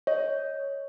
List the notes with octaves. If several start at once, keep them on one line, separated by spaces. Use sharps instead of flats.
C#5 D#5